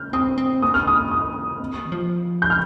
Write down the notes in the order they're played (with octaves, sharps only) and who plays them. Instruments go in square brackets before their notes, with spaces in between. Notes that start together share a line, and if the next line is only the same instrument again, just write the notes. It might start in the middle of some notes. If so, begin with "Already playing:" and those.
Already playing: [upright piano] F6 G6
[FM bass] C4 [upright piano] D#6
[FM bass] C4
[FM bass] A#3 [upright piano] D#6
[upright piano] F6
D#6
D#6
[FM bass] C4
A#3
D#3
F3
[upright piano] G6
F6